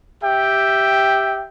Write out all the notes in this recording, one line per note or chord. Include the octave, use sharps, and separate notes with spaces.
G4 E5 G5